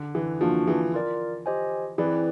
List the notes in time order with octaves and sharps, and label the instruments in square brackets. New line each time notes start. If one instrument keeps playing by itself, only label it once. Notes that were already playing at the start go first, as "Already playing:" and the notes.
Already playing: [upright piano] D3
E3
[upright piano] F3 [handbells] A#3 D4 F#4
[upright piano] E3
[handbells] F4 A#4 D5
G4 C5 D#5 G#5
[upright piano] E3 [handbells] C4 E4 G#4 B4 D5